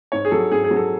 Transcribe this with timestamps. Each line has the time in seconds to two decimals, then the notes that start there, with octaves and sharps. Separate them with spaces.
0.12 G#2 C#5
0.25 G#4
0.31 F#3 A4
0.51 G#2 G#4
0.64 G#4
0.71 F#3
0.76 A4